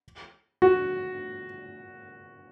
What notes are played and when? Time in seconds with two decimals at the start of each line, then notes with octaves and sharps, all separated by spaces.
0.62 F#4